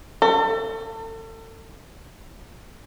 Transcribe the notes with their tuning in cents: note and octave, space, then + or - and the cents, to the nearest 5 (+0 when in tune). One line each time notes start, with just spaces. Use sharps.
A4 +35